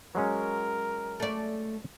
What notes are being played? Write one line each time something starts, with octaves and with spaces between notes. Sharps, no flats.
F#3 G#3 C#4 A#4
A3 D5